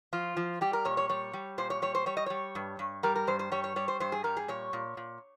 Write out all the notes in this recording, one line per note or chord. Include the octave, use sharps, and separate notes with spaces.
F3 F4
F3
G3 G4
A#4
A#2 C#5
C#5
G3 C#5
G3
A#2 C5
C#5
G3 C#5
C5
G3 C#5
D#5
G3 C#5
G2
G2
G3 A#4
A#4
G2 C5
C5
G3 C#5
C#5
G3 C#5
C5
G2 C5
G#4
G3 A#4
G#4
A#2 C#5
A#2
A#2